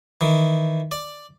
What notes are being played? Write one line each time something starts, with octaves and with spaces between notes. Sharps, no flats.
D#3 E3
D5